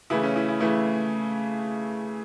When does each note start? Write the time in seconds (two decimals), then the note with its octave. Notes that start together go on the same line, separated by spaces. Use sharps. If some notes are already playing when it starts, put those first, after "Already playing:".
0.10 C#3 E3 A3 E4
0.23 C#4
0.36 E4
0.48 E4
0.60 C#3 E3 A3 E4